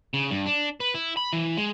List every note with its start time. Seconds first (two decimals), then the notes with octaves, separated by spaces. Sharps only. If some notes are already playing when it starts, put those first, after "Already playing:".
0.14 C#3
0.31 G2
0.46 D4
0.80 B4
0.94 E4
1.17 B5
1.33 E3
1.57 G#3